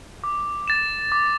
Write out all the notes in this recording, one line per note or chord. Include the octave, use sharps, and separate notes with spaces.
D6
A6 E7
D6